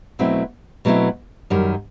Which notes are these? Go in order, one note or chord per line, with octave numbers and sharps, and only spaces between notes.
B2 F#3 A3 C4 E4
B2 F#3 A3 C4 E4
F#2 D#3 G3